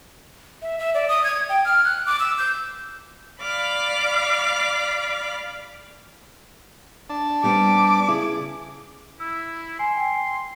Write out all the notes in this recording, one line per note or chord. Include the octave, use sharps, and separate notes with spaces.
E5
E5
D5
D#6
G#6
G5
F6
F#6
D6
E6
G6
D5 F5 B5 D6
D4 A5
G3 B3 C4 D6
C#3 E4 G#4
E4 E6
G#5 C6
G5